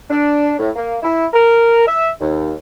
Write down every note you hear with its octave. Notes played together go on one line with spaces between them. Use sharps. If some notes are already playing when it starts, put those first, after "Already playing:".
D4
A2
A#3
E4
A#4
E5
D#2